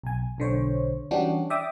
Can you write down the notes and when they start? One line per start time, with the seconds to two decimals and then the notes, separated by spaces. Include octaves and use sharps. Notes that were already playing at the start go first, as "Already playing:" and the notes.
0.03 B1 G#5
0.38 B1 D3 C5 C#5
1.11 E3 G3 C#4 D4 F#4 G4
1.50 D5 E5 G5 D6 D#6